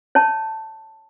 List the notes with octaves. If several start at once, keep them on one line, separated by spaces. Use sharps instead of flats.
C#5 A5